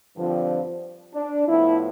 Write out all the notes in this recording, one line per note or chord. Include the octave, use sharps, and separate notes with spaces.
G2 D3 F3 C4
D4
A2 F3 B3 E4